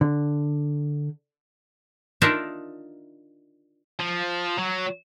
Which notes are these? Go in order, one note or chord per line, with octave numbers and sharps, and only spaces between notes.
D3
D4 D#4 F4 A#4 E5
F3
F#3